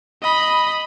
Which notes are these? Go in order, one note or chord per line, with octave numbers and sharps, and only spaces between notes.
D#5 B5